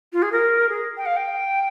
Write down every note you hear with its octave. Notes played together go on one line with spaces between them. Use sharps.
F4
G#4
A#4
G#4
G5
F5
G5